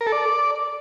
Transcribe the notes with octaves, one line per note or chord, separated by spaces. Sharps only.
A#4
A4
D5